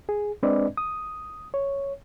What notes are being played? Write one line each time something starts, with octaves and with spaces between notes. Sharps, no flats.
G#4
G#3 C4 D4 B4 D5 D#5
D#6
C#5